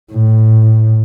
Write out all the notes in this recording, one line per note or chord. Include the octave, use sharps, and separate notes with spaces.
A2